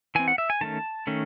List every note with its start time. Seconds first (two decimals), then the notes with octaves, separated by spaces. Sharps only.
0.15 E3 C4 G#5
0.28 F#5
0.38 E5
0.50 G#5
0.61 D#3 A3 C#4 A5
1.07 D#3 A3 C#4